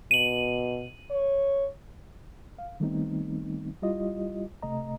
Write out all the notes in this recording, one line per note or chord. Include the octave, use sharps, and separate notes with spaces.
B2 D#7 F#7
C#5
F5
D#3 G3 A3 B3 C4 D#4
G3 E4 F4 G4 D#5
C3 A3 D#5 A#5